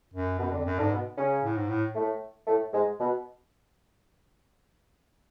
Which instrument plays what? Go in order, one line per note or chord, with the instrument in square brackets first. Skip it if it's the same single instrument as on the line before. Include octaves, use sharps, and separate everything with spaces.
[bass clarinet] F#2
[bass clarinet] F#2 [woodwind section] B2 B3
[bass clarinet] F2 [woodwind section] D3 D4
[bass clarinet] F#2
[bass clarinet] G#2 [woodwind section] D3 D4
[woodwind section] B2 B3
C#3 C#4
[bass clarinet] A2
G#2
A2
[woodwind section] A2 A3
A2 A3
G#2 G#3
B2